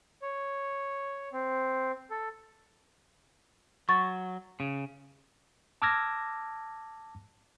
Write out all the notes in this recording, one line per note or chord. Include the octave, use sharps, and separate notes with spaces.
C#5
C4
A4
F#3 C#6 A6
C#3
A5 D6 E6 F6 G#6 A#6